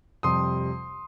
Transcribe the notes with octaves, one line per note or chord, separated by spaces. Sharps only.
F2 C3 G3 C6 D#6